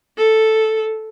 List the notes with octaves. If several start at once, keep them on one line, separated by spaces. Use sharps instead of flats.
A4